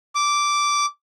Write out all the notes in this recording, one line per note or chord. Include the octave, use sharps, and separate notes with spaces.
D6